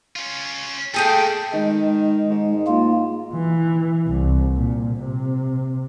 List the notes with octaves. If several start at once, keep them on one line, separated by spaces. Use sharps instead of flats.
C#4 F4
G3 A3 A#3 G#4 A4 G5
D#3 G#3
G#2
G#2 A#3 F4
E3
C2
A#2
C3